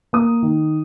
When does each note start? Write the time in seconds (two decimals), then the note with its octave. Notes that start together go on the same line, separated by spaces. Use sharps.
0.13 A#3 D#6
0.42 D#3